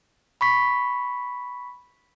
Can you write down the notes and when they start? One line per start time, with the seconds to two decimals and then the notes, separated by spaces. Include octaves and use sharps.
0.41 B5 C#6 B6